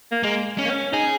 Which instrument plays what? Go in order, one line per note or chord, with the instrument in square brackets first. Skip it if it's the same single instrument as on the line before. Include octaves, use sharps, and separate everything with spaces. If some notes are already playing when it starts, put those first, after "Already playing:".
[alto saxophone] A#3
[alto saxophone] G#3 [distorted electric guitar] A#3
[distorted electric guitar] C#4
[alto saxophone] A#3
C#4
[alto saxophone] D#4 [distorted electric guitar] G#4